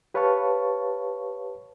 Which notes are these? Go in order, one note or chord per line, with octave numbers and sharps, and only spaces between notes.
G4 B4 C#5 F5 A5 C#6